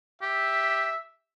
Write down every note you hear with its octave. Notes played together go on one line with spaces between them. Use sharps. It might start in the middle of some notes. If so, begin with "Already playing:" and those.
G4 E5